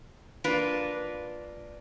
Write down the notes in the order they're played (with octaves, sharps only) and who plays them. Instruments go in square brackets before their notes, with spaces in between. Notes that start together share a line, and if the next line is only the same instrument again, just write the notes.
[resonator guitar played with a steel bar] A#3 D4 F4 B4